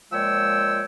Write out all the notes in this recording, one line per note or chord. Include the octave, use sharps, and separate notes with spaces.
A#2 F3 G#3 C#5 G5 E6